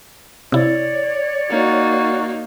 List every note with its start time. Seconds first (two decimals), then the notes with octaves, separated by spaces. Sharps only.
0.52 C3 E4 C#5 D5
1.50 A#3 D#4 F#4